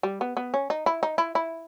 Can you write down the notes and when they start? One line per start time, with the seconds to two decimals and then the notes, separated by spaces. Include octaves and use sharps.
0.03 G3
0.21 B3
0.37 B3
0.54 C#4
0.70 D#4
0.86 E4
1.03 D#4
1.18 E4
1.35 E4